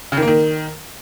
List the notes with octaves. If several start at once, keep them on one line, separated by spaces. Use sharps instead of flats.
C#3
D#3
A#3
D#3